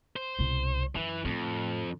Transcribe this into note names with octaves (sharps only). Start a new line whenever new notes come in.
C5
C2 B2
F#2 E3
F2 A2